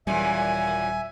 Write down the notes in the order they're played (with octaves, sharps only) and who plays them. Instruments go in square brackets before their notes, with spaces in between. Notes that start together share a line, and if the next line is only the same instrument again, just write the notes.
[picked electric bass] D#1 G3 [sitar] F#2 A#2 E3 [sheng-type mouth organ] E5 [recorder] G#5